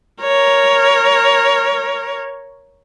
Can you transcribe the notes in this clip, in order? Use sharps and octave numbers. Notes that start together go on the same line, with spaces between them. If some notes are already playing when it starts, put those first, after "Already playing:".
A#4 C#5